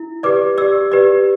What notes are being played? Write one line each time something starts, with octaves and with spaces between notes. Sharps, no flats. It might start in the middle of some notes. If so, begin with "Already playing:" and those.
Already playing: E4
G4 B4 D5 D6
G4 D5 E6
G4 B4 D5